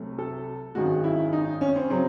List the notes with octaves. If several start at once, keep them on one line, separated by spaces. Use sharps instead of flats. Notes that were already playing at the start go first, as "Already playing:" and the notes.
Already playing: C2 C3 F#3 A3
A4
G#1 F#2 D#3 G#3 F#4
E4
D#4
C#4
C4
C#3 F#3 C4